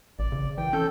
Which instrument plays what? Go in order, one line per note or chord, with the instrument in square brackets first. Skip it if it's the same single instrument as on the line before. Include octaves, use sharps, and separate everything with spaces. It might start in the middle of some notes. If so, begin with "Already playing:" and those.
[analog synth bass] A1 [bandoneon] D5
[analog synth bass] C#3
[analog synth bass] E3 [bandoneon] G5
[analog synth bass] C#4 [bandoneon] A4 G6